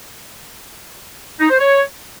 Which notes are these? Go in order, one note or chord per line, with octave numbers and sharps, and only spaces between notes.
D#4
C5
C#5